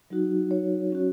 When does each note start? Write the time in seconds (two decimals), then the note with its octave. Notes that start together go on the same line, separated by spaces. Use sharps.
0.10 F#3 D#4 F#4
0.51 C#5
0.90 F#3 C#4 F#4